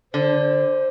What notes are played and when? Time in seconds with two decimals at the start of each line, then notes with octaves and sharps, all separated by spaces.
0.13 D3 C5